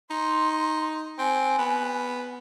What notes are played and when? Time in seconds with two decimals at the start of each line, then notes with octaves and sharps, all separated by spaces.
0.10 D#4 C6
1.19 C4 G#5
1.59 B3